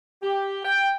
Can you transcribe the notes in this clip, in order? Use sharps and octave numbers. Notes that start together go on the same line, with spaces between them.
G4
G5